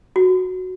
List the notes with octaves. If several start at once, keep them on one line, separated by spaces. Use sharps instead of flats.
F#4